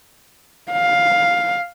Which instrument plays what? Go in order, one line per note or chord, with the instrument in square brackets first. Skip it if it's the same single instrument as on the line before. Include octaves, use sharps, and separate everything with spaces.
[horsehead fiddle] F5